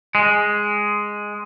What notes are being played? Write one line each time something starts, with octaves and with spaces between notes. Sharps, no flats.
G#3